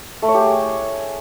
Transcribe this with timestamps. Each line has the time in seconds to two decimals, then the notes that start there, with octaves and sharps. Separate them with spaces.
0.22 A3
0.28 C#5
0.34 G4
0.41 G#4